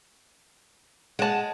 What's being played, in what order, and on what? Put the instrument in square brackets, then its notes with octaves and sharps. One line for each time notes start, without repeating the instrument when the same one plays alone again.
[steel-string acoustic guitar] G#3 [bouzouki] F#5 A5